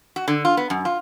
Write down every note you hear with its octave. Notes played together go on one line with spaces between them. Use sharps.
F#4
D3
F4
B3
F#2
F4